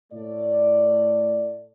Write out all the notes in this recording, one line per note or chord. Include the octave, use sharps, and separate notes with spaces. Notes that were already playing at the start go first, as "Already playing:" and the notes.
A2 A3 D5